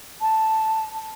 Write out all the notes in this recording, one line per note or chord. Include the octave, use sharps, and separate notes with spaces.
A5